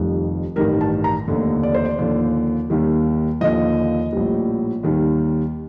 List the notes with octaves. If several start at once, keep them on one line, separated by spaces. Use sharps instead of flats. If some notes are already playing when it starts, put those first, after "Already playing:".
Already playing: F1 F2 D#3 G3
A1 G2 D#3 G3 A#4
A5
A#5
F1 D#2 D3
D5
C5
D5
D#2 D3 F3 D5
D#2 D#3 G3
D#2 D3 F3 D#5
A#1 A2 G3
D#2 D#3 G3